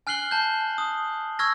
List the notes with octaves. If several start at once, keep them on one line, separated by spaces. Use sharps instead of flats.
G#5 F6 F#6 C7 F#7 G7
A5 G6
D#6
C#6 E6 F6 G#6 A#6